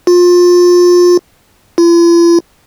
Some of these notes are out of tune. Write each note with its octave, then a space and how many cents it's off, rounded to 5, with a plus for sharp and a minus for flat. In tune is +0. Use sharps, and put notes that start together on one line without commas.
F4 +25
F4 -45